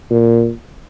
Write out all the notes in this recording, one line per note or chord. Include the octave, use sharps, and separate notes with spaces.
A#2